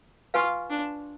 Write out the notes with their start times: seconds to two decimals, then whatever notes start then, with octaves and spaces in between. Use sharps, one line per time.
0.34 F4 B4 F5 G#5 C#6
0.70 D4